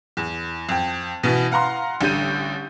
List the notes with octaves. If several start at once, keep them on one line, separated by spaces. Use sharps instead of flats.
E2
F2 G5
B2 E3 B3
F5 F#5 A#5 C6
A1 D3 G3 G6 D#7